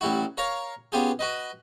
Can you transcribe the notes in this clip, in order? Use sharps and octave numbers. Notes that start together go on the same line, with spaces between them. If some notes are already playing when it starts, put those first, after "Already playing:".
A1 G3 E4 F#4
A#4 C#5 F5 A#5
B3 C#4 F4 G4 G#4
F#4 B4 D#5